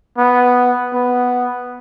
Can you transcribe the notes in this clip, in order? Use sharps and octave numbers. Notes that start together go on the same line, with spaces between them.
B3
B3